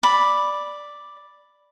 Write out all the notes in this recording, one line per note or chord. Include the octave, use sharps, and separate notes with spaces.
D5 B5